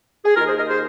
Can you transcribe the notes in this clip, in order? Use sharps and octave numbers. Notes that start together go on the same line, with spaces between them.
G#4
D#2 D#3 F4 A#4
G#4 C5
A#4 D#5
G#4 C5